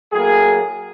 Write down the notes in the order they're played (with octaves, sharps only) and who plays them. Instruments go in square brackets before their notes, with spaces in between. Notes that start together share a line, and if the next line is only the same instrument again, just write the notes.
[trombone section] A2 F#3 A#3 G#4